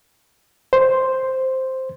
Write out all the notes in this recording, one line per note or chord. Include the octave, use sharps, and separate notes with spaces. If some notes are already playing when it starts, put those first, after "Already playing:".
C5